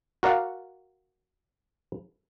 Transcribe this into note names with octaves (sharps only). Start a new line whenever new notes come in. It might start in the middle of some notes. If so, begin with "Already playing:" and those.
F#4 A#4 D5 F5 F#5